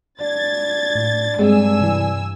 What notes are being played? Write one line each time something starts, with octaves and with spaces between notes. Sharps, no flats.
D4 G#6 A6
A2
G2 G#3 C4 G#4 G#5 E6
C3 E3